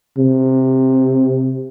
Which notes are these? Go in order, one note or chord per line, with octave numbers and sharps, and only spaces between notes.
C3